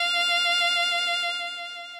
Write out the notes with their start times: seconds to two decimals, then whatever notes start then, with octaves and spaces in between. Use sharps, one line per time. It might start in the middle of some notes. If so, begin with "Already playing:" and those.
Already playing: F5